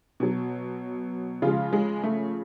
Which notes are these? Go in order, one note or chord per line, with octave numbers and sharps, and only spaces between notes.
B2 F#3
C#3 F3 G#3 F4
G#3
A3